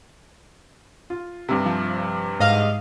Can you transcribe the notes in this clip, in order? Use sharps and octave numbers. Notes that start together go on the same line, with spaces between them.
F4
G2 C3
F3
G#2 D#5 F5